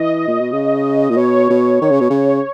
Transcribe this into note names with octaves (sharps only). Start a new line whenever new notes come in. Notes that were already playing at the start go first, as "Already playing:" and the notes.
Already playing: E3 D#5
A#2
B2
C#3
A#2
B2 C#5
B2
D#3
C#3
B2
C#3